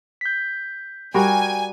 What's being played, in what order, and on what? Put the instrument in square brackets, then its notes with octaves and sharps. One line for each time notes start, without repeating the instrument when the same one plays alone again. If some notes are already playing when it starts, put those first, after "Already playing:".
[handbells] G6 B6
[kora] G3 F#4 A#4 [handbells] G5 [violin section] G#5